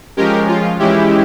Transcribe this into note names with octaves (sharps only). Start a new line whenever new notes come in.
F3 G#3 C#4 G4 A#4
F4
E3 G#3 C#4 E4 G4